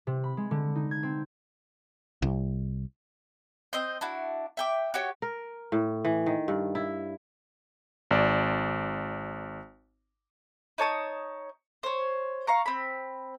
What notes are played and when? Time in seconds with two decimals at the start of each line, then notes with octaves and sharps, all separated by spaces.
0.07 C3
0.24 B5
0.37 G#3
0.51 D3
0.75 D#4
0.91 G#6
1.03 C4
2.22 C2
3.73 C4 D#5 C6 G6
4.01 D4 E4 F#4
4.57 E5 G5 D6
4.94 F#4 G4 C#5
5.22 A#4
5.72 A2
6.05 E3
6.26 D#3
6.48 G2
6.75 E4
8.11 G#1 D5
10.78 D#4 C#5 A5 D#6
11.83 C5 C#5
12.47 F5 A#5 C#6
12.66 C4 B5